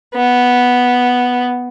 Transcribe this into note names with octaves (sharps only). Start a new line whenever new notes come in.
B3